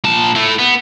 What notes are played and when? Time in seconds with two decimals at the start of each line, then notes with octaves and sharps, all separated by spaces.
0.04 A#2 A5
0.35 A3 E4
0.59 B3